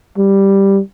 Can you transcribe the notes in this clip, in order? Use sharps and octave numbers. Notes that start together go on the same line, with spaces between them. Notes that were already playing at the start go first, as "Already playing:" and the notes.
G3